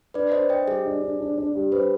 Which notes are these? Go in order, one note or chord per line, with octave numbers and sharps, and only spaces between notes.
D4 B4 D5
D4 C5 D#5
C5 D#5 G5
G3 G#4
D4
D4
D4
D4
G3
G4 B4 C5